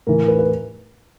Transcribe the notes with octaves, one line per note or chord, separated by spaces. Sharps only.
A2 E3 A#4
B4
B4